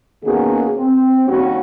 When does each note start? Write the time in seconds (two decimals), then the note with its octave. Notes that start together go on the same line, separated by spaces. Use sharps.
0.25 B2 D#3 A#3 C#4 F#4 G#4
0.77 C4
1.28 D#2 G3 C#4 F#4